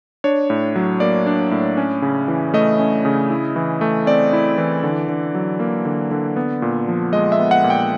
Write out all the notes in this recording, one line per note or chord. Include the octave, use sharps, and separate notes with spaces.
D4 C#5
A2
F#3
A#3 D5
D4
A2
C#4
C#3
E3
A3 D#5
C#4
C#3
E4
E3
A3
C4 D5
E4
E3
D3
D3
F#3
A#3
D3
D3
B3
A#2
F3
G#3 D#5
E5
B3
F#5
A#2
G5